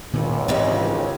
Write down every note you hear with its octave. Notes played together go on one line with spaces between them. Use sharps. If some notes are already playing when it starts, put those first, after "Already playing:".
G#1 C#2 A#2 D#3
G#2 C3 D#3 E3 G3 C#4